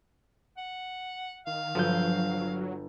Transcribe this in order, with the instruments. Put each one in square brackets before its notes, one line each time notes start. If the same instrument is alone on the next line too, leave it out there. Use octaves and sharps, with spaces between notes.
[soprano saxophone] F#5
[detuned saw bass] D#3 [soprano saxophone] F5
[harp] G1 G6 [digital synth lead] F3 [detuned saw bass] F#3